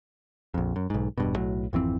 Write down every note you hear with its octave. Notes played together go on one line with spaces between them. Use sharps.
A#1 F2
F#2
B1 G#2
E1 G2 B2
B1 A2 F#3
G#1 F2 E3 C4